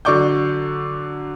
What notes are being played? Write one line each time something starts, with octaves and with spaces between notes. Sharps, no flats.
D3 F#3 D5 C#6 D6 G6